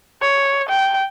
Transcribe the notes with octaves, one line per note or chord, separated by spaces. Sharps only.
C#5
G5